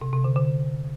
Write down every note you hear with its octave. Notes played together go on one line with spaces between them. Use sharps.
C3
C3
D3
D3